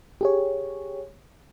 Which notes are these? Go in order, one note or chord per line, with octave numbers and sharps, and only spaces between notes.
G4 G#4 C#5